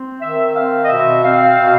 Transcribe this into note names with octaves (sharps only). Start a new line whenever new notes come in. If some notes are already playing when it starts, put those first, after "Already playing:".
Already playing: C4
D#3 E5
C4 F5
D#5
B2 E5
C4 F5
B2